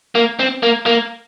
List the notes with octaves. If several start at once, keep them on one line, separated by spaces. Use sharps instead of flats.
A#3
C4
A#3
A#3